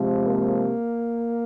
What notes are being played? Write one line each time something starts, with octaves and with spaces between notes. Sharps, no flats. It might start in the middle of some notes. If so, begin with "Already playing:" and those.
Already playing: C3 F3 G#3
A#3